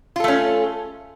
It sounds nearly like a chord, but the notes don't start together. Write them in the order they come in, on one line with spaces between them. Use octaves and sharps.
F4 A4 A3 C#4